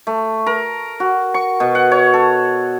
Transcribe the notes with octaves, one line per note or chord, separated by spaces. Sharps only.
A3
A#4
F#4
C#6
B2
F#5
C#5
A4